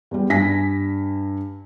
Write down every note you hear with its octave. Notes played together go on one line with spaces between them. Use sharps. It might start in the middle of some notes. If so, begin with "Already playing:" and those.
E2 G3
G2 G#5 A#6 B6